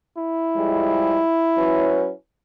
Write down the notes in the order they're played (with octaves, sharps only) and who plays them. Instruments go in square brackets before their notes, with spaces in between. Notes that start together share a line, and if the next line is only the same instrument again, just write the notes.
[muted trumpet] E4
[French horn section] F3 G3 G#3
F#3 C#4 B4